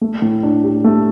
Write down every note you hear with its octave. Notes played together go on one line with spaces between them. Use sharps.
A3
A2
D4
G4
A3